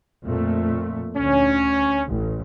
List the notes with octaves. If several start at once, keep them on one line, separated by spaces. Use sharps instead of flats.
F2 A#2 A3
D2 C#4
A1